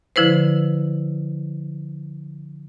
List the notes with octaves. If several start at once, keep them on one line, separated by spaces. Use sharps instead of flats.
D3 F3 E4 B4 C5